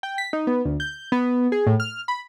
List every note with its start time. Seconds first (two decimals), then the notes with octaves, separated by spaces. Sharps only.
0.03 G5
0.18 B6
0.33 D#4
0.47 B3
0.65 D2
0.80 G6
1.12 B3
1.52 G#4
1.67 A2
1.80 F6
2.08 B5